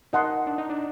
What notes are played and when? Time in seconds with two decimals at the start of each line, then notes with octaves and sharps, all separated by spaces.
0.13 D#4 A#4 D#5 F#5 A5 C6
0.47 D4
0.58 D#4
0.70 D4